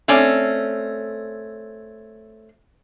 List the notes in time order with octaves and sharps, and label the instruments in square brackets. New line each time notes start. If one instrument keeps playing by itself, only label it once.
[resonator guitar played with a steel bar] A3 C4 C#4 D5